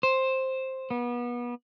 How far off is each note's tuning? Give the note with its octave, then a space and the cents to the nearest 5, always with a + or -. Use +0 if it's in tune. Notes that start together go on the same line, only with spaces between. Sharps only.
C5 +10
B3 -30